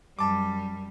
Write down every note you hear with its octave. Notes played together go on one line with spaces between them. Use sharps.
F#2 G3 A5 D6